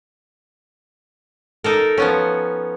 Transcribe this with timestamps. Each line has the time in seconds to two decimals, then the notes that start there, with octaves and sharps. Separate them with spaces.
1.64 D#4 A4 A#4
1.98 F3 B3 C#4